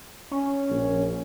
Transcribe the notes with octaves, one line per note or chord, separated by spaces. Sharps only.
C#4
A#1